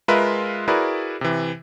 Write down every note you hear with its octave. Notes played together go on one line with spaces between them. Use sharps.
G#3 F4 A#4 B4 E5
E4 F#4 G#4 A#4 B4 D5
C3 E3